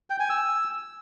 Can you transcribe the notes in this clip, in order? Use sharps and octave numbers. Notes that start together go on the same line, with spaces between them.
G5
G#5
E6